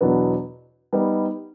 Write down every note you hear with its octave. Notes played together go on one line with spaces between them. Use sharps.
E2 B2 F#3 B3 D4
G3 B3 D#4